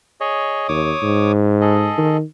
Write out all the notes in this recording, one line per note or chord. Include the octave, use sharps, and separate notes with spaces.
G#4 C#5 D#5
D#2 C#5 D6 D#6
G#2
G#4 A4 D#5
D#3